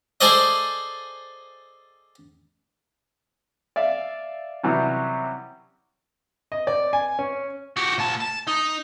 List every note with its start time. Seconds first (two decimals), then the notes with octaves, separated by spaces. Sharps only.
0.21 G#4 A4 C5 D5 D#5
3.76 D5 E5 F5
4.63 C3 E3 F#3 G3 C#4
6.52 D#5
6.67 D5
6.93 G#5
7.19 C#4
7.77 F#4 G4
7.98 A#2 A5
8.20 A5
8.48 D#4